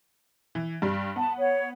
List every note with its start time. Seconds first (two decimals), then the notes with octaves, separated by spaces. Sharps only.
0.55 E3
0.82 G2 G3
1.16 B3 A5
1.38 C#5 F#5